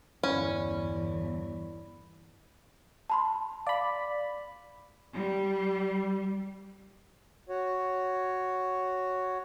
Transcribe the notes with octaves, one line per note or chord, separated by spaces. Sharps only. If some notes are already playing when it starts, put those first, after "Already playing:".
G1 E2 C#4 E4 D5 B5
A5 B5 C6
D5 F5 B5
G3
F#4 C#5